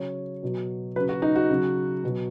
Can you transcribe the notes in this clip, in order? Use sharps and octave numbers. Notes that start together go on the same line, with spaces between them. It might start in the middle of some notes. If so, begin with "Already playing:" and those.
Already playing: C#3 F#3 C#5
B2 F#3
C#3 F#3 B4
F#4
D#4
F#4
C#3 F#3
B2 F#3